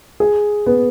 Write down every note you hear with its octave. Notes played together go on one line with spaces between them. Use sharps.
G#4
B3